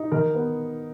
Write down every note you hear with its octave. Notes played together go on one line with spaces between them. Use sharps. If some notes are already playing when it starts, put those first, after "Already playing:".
Already playing: D#4
D#3 A#4
B3